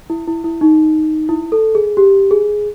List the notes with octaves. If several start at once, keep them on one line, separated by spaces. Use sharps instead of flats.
E4
E4
E4
D#4
E4
A4
G#4
G4
G#4